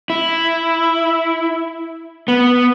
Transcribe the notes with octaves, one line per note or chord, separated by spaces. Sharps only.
E4
B3